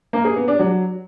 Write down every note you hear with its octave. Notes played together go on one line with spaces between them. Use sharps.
A#3
G#4
B3
D4
F#3